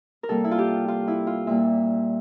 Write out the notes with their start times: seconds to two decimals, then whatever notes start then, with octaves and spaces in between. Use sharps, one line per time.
0.23 A#4
0.29 C3 G3 A#3 A4
0.44 E4
0.51 F4
0.59 G4
0.88 F4
1.08 E4
1.27 F4
1.47 A#2 G3 A#3 E5